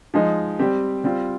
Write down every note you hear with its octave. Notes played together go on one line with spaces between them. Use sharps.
F3 G#3 D#4
G3 C4 G4
G3 C4 F4